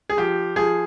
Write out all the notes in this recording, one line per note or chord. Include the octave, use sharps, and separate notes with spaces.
G#4
F3 G4
F3 G#4